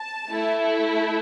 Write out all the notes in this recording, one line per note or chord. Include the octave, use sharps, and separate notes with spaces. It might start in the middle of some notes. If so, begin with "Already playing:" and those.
Already playing: A5
A3 E4 A4